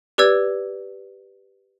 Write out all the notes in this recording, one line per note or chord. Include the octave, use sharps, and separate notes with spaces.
G4 B4 D5 E6 G#6